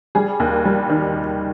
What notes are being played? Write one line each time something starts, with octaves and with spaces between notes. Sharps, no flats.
G3 G#4
D#2
G3
D#3